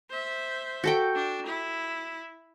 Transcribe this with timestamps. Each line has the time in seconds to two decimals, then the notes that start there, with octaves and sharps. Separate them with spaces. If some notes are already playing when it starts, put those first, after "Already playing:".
0.10 C5 E5
0.84 F#4 A4 G5
1.16 D4
1.46 E4